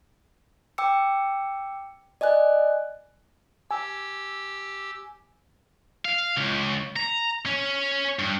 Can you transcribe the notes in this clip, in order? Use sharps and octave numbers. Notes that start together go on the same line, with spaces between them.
G5 D6 E6 C#7
D5 D#5 G#5 F#6
G4 G#5 E6
F5
C#2
A#5
C#4
G2